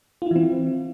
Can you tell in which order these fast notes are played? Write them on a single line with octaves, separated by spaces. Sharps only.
F4 E4 E3 C4